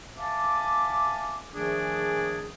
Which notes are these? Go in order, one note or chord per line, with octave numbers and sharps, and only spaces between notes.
E5 F5 G#5 A5 D6
D#3 F3 A3 D4 G#4